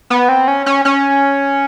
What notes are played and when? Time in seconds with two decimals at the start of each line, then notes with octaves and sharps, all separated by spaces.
0.10 B3
0.29 C4
0.48 C#4
0.66 C#4
0.85 C#4